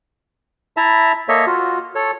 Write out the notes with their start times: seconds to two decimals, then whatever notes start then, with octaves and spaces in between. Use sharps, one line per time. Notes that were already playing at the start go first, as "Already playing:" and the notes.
0.77 E4 E5 A5 A#5
1.28 A#3 A4 C#5 D#5 E5
1.46 F4 F#4
1.95 A4 C#5